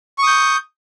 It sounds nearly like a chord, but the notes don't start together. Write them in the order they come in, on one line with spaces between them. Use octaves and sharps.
C#6 D#6 G6